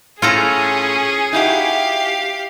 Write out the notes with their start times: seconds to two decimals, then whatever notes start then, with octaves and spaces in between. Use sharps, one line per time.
0.22 A2 C#4 F4 G#4 A4 A#5
1.33 D#4 E4 F#4 G4 F5